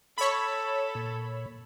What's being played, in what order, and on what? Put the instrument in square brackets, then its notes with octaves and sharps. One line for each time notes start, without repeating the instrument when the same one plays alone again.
[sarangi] A4 [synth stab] C#5 B5
[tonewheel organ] A#2